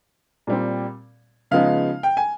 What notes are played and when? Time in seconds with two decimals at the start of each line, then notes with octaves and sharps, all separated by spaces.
0.47 A#2 G3 C4
1.51 C#3 F3 G#3 B3 D#4 F5
2.03 G5
2.17 G#5